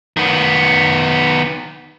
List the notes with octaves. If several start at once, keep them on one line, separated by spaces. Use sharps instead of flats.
D#3 B3